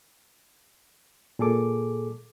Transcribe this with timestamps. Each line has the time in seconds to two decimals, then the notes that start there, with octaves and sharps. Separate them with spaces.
1.39 A#2 G#4 A4 D6